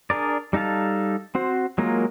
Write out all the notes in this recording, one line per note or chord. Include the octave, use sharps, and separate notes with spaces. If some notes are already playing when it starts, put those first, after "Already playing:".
D4 G#4 A#4 D5
G3 D#4 A4 F5 A5
C4 F#4 C5
F#3 G#3 A#3 F4 A#4